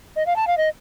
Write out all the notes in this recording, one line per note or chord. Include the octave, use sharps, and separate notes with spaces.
D#5
F5
A5
F5
D#5